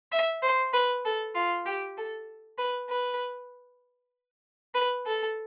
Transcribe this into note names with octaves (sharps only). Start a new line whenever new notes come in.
E5
C5
B4
A4
F4
G4
A4
B4
B4
B4
A4